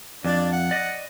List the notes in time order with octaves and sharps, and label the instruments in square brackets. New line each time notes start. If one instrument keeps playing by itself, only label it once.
[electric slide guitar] F2 [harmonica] D4 D5
[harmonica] F#5
[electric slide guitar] D5 D#5